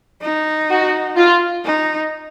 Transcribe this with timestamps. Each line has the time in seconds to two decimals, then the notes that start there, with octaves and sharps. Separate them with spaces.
0.22 D#4
0.70 F#4
1.16 F4
1.65 D#4